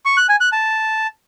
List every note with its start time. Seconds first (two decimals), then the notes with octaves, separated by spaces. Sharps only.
0.05 C#6
0.17 F#6
0.29 G#5
0.41 F#6
0.52 A5